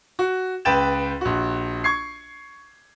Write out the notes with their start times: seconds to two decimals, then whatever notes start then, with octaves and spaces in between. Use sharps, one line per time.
0.19 F#4
0.65 C#2 B4 G5 A6 E7
1.21 A#1 F#4
1.84 C#6 G#6 C7